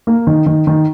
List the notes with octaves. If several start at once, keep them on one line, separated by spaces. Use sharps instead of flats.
A#3
D#3
D#3
D#3